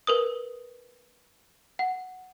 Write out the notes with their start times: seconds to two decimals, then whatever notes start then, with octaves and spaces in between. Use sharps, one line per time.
0.07 A#4 B4 D#6
1.79 F#5